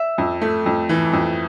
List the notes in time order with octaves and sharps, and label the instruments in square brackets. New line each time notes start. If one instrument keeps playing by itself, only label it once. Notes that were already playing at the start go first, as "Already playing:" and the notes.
Already playing: [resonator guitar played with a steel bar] E5
[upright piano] F2
A3
F2
E3
F2